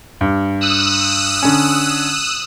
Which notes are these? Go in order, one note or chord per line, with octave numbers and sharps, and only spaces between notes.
G2
D#6 E6 F#6
D3 C#4